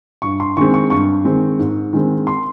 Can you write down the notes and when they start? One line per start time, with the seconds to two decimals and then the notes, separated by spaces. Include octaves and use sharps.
0.22 G2 C#6
0.40 C6
0.57 D#3 G#3 C4 C#6
0.74 C#6
0.90 G2 C#6
1.25 D#3 G#3 C4
1.59 G#2
1.93 D#3 G#3 C4
2.27 C6